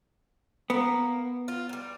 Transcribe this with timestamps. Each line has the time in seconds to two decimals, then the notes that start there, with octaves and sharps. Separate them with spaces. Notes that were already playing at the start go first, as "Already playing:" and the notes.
0.70 A#3 B3
1.48 F4
1.69 F#3 G3